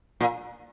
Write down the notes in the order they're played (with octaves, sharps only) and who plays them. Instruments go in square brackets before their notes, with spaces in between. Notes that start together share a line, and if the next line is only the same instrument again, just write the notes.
[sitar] A#2